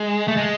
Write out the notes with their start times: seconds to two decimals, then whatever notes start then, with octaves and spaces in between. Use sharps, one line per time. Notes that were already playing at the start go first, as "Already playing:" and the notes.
Already playing: G#3
0.28 A3
0.37 G#3